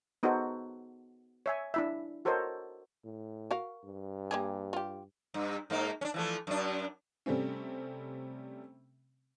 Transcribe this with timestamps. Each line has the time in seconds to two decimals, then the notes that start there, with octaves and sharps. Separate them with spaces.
0.23 B3 D#4 F#4 G#4 A4 C5
1.46 C#5 E5 G#5
1.74 D4 E4 E5
2.25 F#4 A4 A#4 C5 C#5 D#5
3.04 A2
3.51 F#4 A#4 F5
3.85 G2
4.31 A#3 G4 G#4
4.73 F4 G4
5.34 G2
5.70 G#2 A#3 D#4
6.01 C#4 D4
6.14 E3 F3 A3
6.47 F#2 D4
7.26 C3 G3 A3 C4 C#4